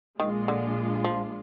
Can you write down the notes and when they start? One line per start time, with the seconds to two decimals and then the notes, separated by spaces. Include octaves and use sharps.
0.20 A#1 A#2 D#3 G#3 D4 F4
0.48 D3
1.04 F3